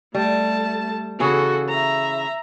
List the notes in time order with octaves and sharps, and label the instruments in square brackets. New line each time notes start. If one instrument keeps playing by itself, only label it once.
[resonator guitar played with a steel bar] G3 [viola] A3 A5
[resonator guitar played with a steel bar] C#3 E3 G#4 [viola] F#4 A4
[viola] E5 A#5